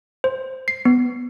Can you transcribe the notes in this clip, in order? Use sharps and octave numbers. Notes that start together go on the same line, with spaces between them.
C5
C7
B3